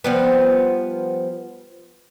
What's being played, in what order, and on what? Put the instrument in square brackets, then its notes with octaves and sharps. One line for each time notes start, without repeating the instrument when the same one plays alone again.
[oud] F3 G3 B3